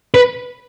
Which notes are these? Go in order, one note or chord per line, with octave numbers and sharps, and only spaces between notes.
B4